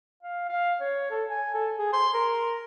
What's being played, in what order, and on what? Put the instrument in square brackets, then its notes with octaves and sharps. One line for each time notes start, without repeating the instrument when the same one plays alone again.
[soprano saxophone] F5
F5
C#5
A4
G#5
A4
G#4
C6
A#4